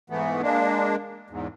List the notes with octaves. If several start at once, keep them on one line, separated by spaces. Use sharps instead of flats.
G#2 E3 A3 B3
G#3 A#3 D4
E2 G#2